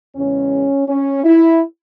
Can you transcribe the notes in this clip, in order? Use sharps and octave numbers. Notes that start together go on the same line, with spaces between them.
E2 C#3 G#3 C#4
C#4
E4